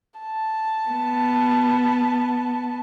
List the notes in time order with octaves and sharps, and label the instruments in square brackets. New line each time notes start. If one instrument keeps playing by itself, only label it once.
[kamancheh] A5
[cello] B3